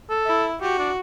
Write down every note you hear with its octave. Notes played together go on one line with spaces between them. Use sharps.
A4
E4
F#4 G4
D4